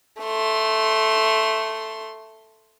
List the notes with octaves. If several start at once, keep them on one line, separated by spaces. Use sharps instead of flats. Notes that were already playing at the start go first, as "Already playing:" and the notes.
A3 C6